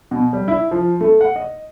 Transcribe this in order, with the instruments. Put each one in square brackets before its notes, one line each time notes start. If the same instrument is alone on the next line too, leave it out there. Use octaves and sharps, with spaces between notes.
[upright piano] B2
G3
E4
F3
A3
F#5
D#5